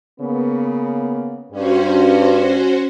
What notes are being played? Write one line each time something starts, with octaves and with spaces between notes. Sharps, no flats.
C#3 A#3 B3
G2 C#4 F#4 C5